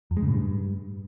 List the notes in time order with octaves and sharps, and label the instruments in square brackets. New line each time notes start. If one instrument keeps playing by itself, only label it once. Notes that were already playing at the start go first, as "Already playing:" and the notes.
[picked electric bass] F2
G#3
C#3
A2
G2